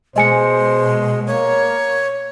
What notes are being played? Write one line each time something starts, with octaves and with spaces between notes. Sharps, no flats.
B2 G#3 C5 D#5 G#5 C#7
A#3 C#5